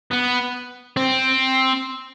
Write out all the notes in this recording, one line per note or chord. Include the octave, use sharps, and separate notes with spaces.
B3
C4